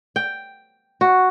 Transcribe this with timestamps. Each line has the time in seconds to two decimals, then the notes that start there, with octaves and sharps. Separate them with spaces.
0.16 G5
1.01 F#4